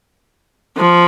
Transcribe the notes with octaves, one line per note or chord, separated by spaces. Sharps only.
F3